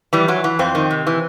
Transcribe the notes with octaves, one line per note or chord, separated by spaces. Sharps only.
E3 G3
E3 F#3
E3
F2 C4
D#3
C3
E3